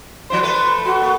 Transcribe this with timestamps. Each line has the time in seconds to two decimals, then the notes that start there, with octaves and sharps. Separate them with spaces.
0.30 F3 E4 C5 C6
0.43 A3 B4
0.85 F#4
1.02 A#3